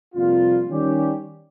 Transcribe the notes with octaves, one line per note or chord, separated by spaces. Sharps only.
F2 C3 G3 A#3 F4
D#3 G3 C#4 G4